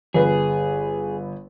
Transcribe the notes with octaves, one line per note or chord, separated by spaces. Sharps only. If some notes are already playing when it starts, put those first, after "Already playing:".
G1 G#4 B4